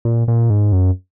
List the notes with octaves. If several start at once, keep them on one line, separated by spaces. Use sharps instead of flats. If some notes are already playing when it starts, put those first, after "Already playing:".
A#2
A#2
G#2
F#2